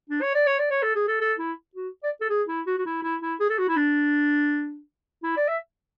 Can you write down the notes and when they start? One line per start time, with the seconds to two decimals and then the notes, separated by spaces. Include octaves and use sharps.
0.10 D4
0.21 C#5
0.34 D5
0.46 C#5
0.59 D5
0.70 C#5
0.83 A4
0.95 G#4
1.08 A4
1.21 A4
1.39 E4
1.75 F#4
2.03 D5
2.21 A4
2.29 G#4
2.48 E4
2.67 F#4
2.78 F#4
2.86 E4
3.03 E4
3.22 E4
3.40 G#4
3.50 A4
3.58 F#4
3.68 E4
3.76 D4
5.24 E4
5.37 D5
5.48 E5